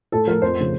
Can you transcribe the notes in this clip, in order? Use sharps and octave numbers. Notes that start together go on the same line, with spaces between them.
A2 A4
F3 A3 A#4
F2 C5
C#3 F3 A3